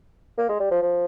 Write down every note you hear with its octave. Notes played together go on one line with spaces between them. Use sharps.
A#3
G#3
G3
F3
F3